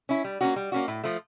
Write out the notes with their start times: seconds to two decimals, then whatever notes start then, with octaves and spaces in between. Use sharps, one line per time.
0.09 C#4 E4
0.24 G3
0.41 A#3 C#4 F#4
0.56 G3
0.72 A#3 C#4 F#4
0.88 A2
1.04 F3 A3